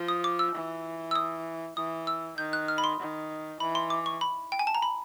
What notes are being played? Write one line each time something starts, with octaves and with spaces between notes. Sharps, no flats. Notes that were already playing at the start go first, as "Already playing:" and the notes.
Already playing: F3
D#6
D6
E6
E3
E6
D#6
E3 D#6
E6
D#3 G6
F#6
F6
B5
C6
D#3
E3 B5
C6
D6
C#6
B5
G5
G#5
A5
A#5
B5